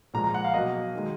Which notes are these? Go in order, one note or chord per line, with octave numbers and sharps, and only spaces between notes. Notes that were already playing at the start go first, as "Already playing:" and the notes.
A#2 F3 G#3 A#5
A#5
F#5
F5
B2 F#3 A#3 D#5
D#3 G#3